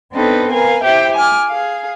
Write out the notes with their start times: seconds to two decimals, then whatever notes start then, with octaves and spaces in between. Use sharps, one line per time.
0.13 B3 C4 D4 D#4 A4 B4
0.52 A#4 B4 F5 G#5
0.83 E4 G4 C5 E5 G5
1.16 G#5 D6 F6
1.48 G#4 F5